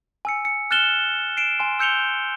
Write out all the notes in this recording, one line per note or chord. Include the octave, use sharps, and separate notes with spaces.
G#5 E6 C#7
C#7
F6 F#6 A6 E7 G7
C7 D7 E7
G#5 C6
E6 G6 C#7 F7 G7